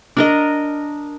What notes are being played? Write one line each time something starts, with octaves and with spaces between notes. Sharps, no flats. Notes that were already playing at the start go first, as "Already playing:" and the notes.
D4 A#4 D#5